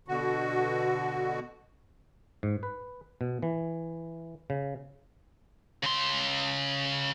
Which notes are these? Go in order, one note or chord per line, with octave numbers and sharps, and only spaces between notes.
B2 D3 F#4
G#2
B4
B2
E3
C#3
C#3 C6